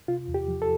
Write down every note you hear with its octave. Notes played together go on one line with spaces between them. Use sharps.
C3 F4
E2
G4
F3
A4